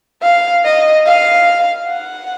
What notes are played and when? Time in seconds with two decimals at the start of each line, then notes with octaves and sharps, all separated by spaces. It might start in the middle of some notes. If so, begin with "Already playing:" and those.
0.22 F5
0.65 D#5
1.06 F5
1.89 F#5